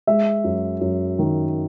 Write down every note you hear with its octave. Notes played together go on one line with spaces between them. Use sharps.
G#3 E5
F#2
F#2
D#3